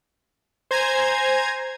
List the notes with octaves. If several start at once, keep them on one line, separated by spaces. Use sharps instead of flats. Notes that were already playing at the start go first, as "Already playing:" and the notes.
C5 G#5 A#5 G#6